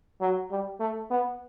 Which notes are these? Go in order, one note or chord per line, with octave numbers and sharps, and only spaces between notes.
F#3
G3
A3
B3